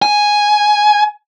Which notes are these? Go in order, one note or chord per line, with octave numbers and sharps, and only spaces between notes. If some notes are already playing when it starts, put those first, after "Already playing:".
G#5